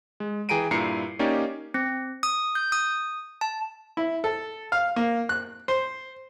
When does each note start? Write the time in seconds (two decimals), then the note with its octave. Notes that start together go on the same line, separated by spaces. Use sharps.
0.20 G#3
0.49 E3 G#4 G5 A#5 D7 D#7
0.71 G2 A#2 E4 A#5 C7 C#7
1.19 A#3 C#4 D#4 G4 C#5 D5
1.74 C4
2.23 D#6
2.55 G6
2.72 D#6
3.41 A5
3.97 E4
4.24 A4
4.72 F5
4.96 A#3
5.29 F#6
5.68 C5